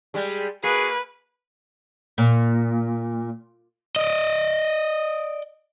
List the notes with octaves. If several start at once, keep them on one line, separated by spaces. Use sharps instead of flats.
G3 G#3
A#3 F#4 G#4 B4
A#2
D5 D#5